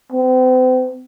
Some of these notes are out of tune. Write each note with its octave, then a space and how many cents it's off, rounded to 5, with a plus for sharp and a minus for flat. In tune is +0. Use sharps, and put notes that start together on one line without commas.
C4 -40